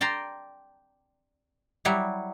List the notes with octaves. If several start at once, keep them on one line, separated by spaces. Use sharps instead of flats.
D5 G5 A5 A#5 C6
F#3 G3 E4